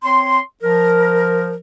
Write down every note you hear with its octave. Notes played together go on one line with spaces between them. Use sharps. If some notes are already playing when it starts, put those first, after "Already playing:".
C4 C#5 C6
F3 A#4